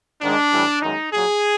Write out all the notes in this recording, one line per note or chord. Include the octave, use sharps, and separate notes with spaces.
G#2 D#3 G#3 D4
A2 E3 G3
F#2 D#3 G#3 D#4
A#2 F#3 G#4